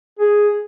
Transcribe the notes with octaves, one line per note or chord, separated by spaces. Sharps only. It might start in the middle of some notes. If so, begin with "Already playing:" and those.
G#4